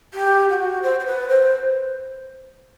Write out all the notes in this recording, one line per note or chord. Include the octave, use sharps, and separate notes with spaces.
G4
F#4
C5
C5
B4
C5